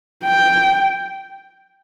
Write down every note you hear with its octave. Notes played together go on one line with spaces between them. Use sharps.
G5